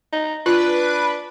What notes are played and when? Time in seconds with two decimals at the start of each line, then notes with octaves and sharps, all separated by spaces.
0.12 D#4
0.46 D4 F4 B4